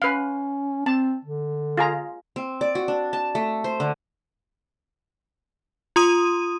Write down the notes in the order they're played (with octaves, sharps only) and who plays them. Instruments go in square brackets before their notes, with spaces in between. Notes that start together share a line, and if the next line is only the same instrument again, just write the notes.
[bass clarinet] C#4 [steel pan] B4 F5
[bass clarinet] C4 [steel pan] A5
[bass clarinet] D3
[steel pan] F4 G#4 A#5
[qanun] C4
D5
F#4
D4
A5
A3
C5
D3
[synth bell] F4 C6 D#6 D#7